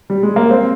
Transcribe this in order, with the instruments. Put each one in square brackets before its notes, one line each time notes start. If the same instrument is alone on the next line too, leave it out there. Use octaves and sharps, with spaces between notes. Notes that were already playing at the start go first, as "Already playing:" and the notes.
[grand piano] G3
G#3
A#3
C4